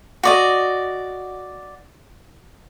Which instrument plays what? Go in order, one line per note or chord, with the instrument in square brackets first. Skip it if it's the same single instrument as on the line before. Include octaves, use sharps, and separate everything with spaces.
[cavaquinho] F#4 D5 D#5